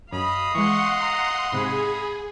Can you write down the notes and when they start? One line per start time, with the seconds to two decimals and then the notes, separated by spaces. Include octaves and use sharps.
0.12 F#2 D#5 F5 B5
0.54 E3 G#3 F#5 C6 C#6
1.01 A#5
1.52 G#2 C3 G#4 B5